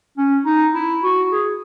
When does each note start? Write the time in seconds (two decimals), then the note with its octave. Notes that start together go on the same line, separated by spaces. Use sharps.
0.17 C#4
0.45 D#4
0.74 E4
1.03 F#4
1.32 G#4